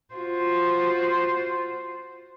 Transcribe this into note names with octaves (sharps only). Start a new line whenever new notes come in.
F4 F#4 C5